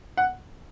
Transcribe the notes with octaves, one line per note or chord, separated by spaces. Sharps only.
F#5